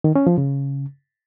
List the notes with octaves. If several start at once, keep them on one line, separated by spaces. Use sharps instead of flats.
D#3
C#4
F3
C#3